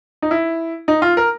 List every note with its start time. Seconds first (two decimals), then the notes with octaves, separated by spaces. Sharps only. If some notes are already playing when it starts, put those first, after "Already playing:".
0.22 D#4
0.31 E4
0.88 D#4
1.02 F4
1.17 A#4